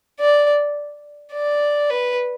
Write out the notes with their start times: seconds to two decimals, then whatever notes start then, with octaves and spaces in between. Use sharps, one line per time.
0.20 D5
1.33 D5
1.90 B4